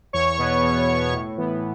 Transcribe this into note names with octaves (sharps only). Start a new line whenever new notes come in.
E2 C#5 C#6
B2 B3
E2
B2 B3
A2
E3 B3